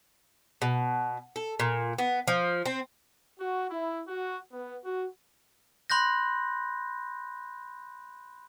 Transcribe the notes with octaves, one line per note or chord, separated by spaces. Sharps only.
B2
A4
A#2
B3
F3
C4
F#4
E4
F#4
B3
F#4
B5 C6 F#6 G6 A#6